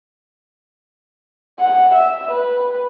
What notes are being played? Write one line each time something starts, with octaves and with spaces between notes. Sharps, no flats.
F#5
E5
B4